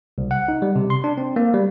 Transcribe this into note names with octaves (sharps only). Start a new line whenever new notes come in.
C2
F#5
D#4
G3
C3
C6
D4
C4
A#3
G3